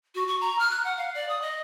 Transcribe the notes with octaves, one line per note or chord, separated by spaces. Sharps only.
F#4
C#6
A#5
F6
F#6
F#5
F5
D5
D#6
D#5